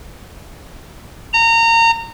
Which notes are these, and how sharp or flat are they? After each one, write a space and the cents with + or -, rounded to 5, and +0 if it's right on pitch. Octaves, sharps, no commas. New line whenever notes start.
A#5 -25